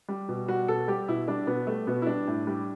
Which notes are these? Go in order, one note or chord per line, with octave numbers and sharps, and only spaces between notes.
G3
B2
G3 F#4
B2 A4
G3 G4
B2 E4
G3 D4
B2 B3
G3 A3
B2 B3
E4
G3 D4
A2
G3